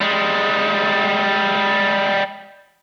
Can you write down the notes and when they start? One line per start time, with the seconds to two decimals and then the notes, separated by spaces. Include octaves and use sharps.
0.01 G3 G#3